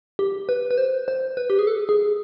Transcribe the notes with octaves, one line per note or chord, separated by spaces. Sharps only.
G4
B4
B4
C5
C5
B4
G4
G#4
A4
G#4